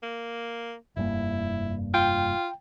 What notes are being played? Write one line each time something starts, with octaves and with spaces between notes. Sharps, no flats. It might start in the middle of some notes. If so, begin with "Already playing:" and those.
A#3
F1 G2 A#3 E4
F4 G5